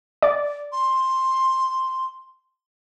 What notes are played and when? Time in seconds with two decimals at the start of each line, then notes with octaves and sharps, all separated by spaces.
0.22 D5
0.72 C6